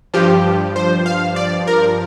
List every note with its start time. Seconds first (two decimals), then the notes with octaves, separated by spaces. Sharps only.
0.14 G2 F3 G4
0.76 C5
1.06 F5
1.36 D5
1.68 A#4